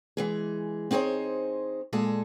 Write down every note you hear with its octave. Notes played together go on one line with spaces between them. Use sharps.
E3 G#3 G#4
C4 D#4 G#4 C5 C#5
A#2 G#3 G#4 A4